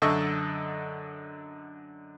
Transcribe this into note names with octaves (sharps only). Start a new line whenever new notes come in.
F#2 D3 A4 D#5 E5 C#6